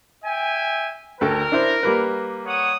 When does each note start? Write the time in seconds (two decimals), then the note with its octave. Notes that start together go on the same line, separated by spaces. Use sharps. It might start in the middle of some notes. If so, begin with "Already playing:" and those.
0.25 E5 G5 G#5
1.21 D2 A4 A#4 G5
1.52 D4 E4 C5
1.83 G3 A#3 B4
2.46 C#5 F#5 D#6